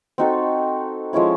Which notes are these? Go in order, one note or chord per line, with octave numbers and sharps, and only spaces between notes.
C4 D#4 F#4 A4
F3 G#3 C#4 E4